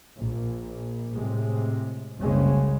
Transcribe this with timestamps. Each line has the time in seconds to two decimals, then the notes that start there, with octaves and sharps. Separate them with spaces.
0.16 A#1
1.14 A2 C3 G#3
2.19 F#1 C2 C#3 G#3 C#4